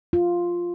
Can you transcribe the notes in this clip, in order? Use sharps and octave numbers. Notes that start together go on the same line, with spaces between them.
F4